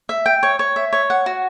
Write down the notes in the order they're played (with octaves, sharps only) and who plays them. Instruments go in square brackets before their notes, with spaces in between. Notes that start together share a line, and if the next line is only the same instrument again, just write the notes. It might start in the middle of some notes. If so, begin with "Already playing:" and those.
[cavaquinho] E5
G5
C#5
C#5
E5
C#5
F#5
F#4